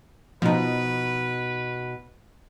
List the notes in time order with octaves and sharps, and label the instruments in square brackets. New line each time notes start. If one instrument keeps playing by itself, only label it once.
[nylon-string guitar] B2 D#4 [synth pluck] F3 [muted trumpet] B4